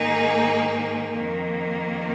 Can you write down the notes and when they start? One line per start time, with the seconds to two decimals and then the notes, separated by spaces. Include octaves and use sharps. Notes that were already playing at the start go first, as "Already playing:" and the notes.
Already playing: G#2 D#3 A#3 D#4 G#4
1.14 F2 D#3 A#3